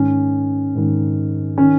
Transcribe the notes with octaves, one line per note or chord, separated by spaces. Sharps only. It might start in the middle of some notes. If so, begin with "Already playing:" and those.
Already playing: G#2 D#3 C#4
G#2 D#3
D#3 C#4